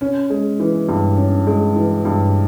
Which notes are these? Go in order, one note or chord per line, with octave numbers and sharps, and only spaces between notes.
C#4
G#3
E3
G2
C#4
G#3
E3
G2